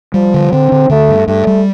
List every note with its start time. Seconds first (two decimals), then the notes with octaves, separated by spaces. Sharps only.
0.14 F3 G3
0.34 D3
0.52 D3 C4
0.72 D3
0.90 D3 A3
1.09 G2
1.27 G2 A3
1.47 G3